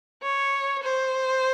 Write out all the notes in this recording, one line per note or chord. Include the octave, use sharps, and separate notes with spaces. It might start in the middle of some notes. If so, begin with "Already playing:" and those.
C#5
C5